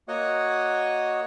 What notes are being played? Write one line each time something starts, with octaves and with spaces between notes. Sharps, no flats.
A#3 F#4 C#5 D#5 F#5